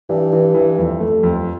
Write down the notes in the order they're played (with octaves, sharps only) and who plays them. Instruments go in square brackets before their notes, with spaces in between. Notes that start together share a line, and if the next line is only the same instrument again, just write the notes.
[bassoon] G2 [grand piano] E3
[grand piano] E3
E3
F2
A3
F2